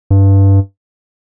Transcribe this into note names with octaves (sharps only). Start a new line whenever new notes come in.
G2